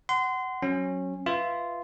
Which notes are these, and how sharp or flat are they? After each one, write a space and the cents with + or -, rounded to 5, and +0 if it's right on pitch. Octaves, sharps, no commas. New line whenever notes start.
F#5 +20 C6 -25
F#3 +0 C#4 -20
F4 -10 B4 +0 E5 +0